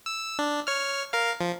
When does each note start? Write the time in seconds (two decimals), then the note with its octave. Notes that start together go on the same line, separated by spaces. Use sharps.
0.06 E6
0.39 D4
0.67 C#5 F6
1.13 A#4 F5
1.41 F3